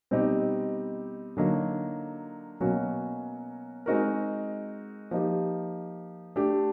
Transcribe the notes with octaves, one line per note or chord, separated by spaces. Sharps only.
B2 G3 C4 D#4 G4
D3 F#3 A#3 D#4
B2 F#3 A#3 C#4 F#4
G#3 C4 D#4 F#4 A#4
F3 A#3 D#4 G4
A3 D4 G4